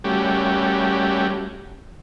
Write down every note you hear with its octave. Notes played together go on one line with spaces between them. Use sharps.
G3 A3 C#4 F#4 G4